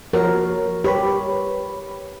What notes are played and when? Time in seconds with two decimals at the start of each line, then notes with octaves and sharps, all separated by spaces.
0.13 F3 F#4 A#4 C#5
0.84 G4 B4 C#5 B5